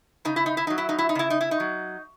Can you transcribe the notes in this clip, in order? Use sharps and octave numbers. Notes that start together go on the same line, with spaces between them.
C#3 D#4
E4
D#4
E4
F#3 D#4
E4
D#4
E4
D#4
C#3 E4
D#4
E4
D#4
F#3